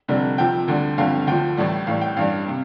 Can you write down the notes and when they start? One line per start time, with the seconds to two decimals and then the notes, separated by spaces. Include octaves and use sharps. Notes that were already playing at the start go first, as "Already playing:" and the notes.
0.08 F1 F2 D3 G3
0.38 F2 C3 F3 G5
0.68 D2 D3 G3
0.98 G1 F2 D3 G3 F5
1.27 D2 D3 F3 G5
1.57 A1 A2 G3
1.87 A1 A2 G3 F5
2.01 G5
2.16 A1 G2 G3 F5
2.48 C3